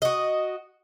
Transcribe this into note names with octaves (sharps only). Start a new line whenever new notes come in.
F#4 D#5